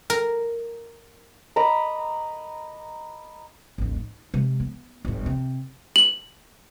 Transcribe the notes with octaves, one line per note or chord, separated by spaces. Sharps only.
A#4
D#5 A#5 B5 D6
A1 D#2
D#4
C3 G#3
B3
G1 A2
C3
F#7